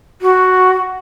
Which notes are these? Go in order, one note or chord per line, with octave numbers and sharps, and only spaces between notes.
F#4